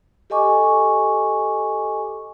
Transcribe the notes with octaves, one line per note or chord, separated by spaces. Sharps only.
G4 A4 D#5 G#5 C#6 D6